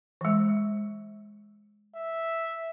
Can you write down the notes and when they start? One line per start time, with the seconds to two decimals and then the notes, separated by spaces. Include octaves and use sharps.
0.21 E3 G#3
1.95 E5